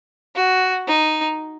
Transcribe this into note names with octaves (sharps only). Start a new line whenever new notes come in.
F#4
D#4